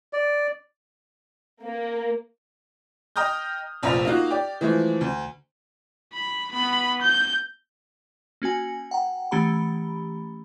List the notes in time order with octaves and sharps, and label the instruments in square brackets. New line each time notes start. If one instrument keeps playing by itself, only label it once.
[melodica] D5
[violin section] A#3
[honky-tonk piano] D#5 G5 A#5 D#6 F6 G6
F1 A#1 F3 E5 A#5 F7
A#3 D#4 F4 F#4
G4 D5
E3 F3 G#3 A3
D2
[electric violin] B5
B3 B5
G6
[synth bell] A#3 C#4 F#4 G#5
F#5 G5 A#5
E3 A3 C#4 G4 A#5 B5